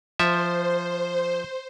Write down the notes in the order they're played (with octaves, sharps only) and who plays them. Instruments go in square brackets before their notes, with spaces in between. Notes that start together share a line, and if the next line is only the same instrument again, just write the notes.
[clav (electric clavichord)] F3 E5 [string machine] C5